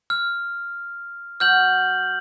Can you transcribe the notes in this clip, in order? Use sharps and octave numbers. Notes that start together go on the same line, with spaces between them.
F6
F#3 F6 G6 F#7